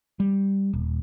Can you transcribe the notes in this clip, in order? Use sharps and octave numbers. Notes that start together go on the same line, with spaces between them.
G3
D#1